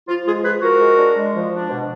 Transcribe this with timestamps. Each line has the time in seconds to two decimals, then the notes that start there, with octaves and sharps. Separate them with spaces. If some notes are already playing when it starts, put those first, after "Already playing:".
0.08 F3 F4
0.26 G#3 F4 G#4
0.44 F3 G#4 B4
0.62 F3 F#4 A#4
0.80 G#3
0.98 D4
1.16 G#3
1.34 F3
1.52 D4
1.70 B2